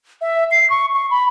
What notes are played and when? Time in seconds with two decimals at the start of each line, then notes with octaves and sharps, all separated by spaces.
0.21 E5
0.51 C7
0.70 C#6
0.95 C#6
1.11 B5